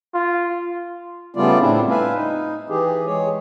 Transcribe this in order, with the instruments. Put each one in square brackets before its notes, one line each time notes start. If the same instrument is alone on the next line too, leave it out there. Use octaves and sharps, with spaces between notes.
[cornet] F4
[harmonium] C#3 G3 A3 B3 F4 D5
A2 C4 D4 E4
B4 E5 F5 G#5
D#4
E3 G4 G#4
G#3 G#4 C#5